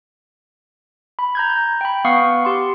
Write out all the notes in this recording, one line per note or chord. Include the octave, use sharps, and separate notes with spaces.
B5
A#5 G6 G#6
G6
G5 B5
B3 F5 F#5 C#6 D#6 C7
G4 C6